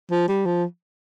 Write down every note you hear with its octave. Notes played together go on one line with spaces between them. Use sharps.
F3
G3
F3